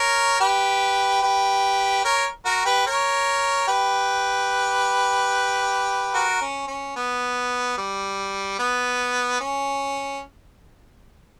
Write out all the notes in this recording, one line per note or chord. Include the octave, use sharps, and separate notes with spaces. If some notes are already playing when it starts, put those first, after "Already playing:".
Already playing: A#4 C#5
G4 B4
G4 B4
A#4 C#5
F#4 A#4
G4 B4
A#4 C#5
G4 B4
F#4 A#4
C#4
C#4
B3
G3
B3
C#4